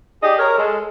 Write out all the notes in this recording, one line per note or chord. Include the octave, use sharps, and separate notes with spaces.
G4 G#4 D5 D#5
A#4 C#5
G#3 A4